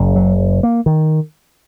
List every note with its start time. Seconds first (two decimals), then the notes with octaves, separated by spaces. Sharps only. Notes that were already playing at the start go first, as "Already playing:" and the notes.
Already playing: F#1 F#2 C#3
0.16 F#3
0.63 A#3
0.86 D#3